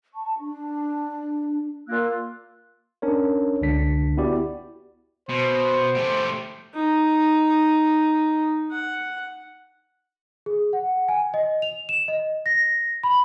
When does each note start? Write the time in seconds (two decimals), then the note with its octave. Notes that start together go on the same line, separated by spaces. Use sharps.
0.14 A5 C#6
0.38 D4
1.88 A#3 F4 E6 F#6
3.02 C#4 D4 A#4 C#5
3.62 C#2 D3 D4 B6
4.17 B3 E4 F#4 G4 D5
5.29 B2 C5
5.95 A3 G4
6.74 D#4
8.72 F#5
10.46 G#4
10.73 F#5
11.08 G#5
11.34 D#5
11.62 F7
11.89 E7
12.08 D#5
12.46 A#6
13.03 B5